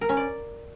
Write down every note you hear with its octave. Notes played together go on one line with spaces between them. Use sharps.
A#4
C#4
D5